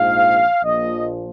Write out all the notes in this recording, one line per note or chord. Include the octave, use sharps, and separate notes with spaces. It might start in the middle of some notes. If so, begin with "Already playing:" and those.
Already playing: A#1 G#2 F3 F5
A#1 A#2 F3 D#5